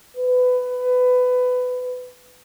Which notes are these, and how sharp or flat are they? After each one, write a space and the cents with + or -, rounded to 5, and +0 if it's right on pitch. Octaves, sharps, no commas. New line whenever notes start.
B4 +20